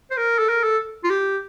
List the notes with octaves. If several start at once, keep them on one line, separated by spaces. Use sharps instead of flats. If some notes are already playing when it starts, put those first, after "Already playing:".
C5
A#4
A4
A#4
A4
F4
G4